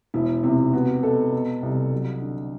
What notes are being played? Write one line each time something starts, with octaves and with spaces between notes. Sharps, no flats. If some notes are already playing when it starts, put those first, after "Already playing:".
E1 E4
C3 E4
B3 F#4
B2 A4
B2
C2
F#3
D3